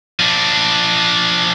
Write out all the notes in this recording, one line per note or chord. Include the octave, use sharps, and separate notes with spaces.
F3 D4